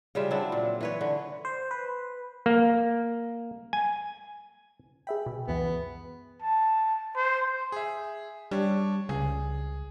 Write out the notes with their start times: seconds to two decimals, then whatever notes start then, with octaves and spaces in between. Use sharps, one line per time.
0.15 C#3 G3 F4 E5
0.31 F#3 C4 D4 E4
0.52 A#2
0.81 E3 B4 C#5
1.01 D3
1.45 C5
1.71 B4
2.46 A#3
3.73 G#5
5.07 G#4 E5 G5 B5
5.26 B2
5.48 C#2 F#2 E3 B3
6.42 A5
7.16 C5
7.72 G#4 E5
8.51 G3 D4 C#5
9.09 C#2 G#4